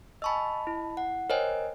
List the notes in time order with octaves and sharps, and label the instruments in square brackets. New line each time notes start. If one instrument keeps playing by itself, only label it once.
[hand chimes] D#5 A5 B5 [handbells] G#5 C#6 E6
[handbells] E4
[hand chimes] F#5
[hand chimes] A#4 D#5 G#5 [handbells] C5 C#5 G5